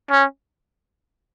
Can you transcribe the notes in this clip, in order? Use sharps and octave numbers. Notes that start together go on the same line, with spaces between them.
C#4